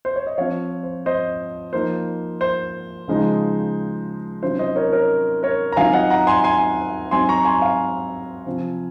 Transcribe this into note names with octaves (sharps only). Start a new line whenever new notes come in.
C5
C#5
D#5
F3 C4 F4 C#5 F5
C5
C5 D#5
F3 A#3 D#4 C5
C5
C#3 F3 G#3 D#4
C3 D#3 F#3 C#4 F4 C5
C5 D#5
A#4 C#5
A#4 C#5
A#4 C#5
A#5
D#3 F#3 C4 F4 F5 G#5
D#5 F#5
F#5 A#5
G#5 C6
G#5 C6
F#3 C4 D#4 G#5 C6
A#5 C#6
G#5 C6
F5 G#5
C3 F3 C4 F4